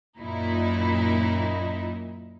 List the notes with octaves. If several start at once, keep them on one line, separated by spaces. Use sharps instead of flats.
F#2 A#2 D#4 E4